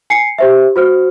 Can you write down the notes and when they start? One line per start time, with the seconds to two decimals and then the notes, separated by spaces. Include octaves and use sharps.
0.10 G#5 C7 C#7
0.38 G4 C5 E5
0.76 F#4 C5 F6